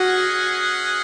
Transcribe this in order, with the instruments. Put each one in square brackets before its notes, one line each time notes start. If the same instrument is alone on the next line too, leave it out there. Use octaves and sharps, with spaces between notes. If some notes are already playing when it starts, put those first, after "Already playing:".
Already playing: [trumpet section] C#4 G#4 D#5 F#5 [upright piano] F#4